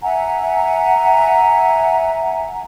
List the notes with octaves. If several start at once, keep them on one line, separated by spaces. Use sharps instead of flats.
E5 F#5 G#5 A#5